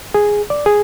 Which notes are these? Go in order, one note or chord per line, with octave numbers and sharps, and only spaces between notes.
G#4
D5
G#4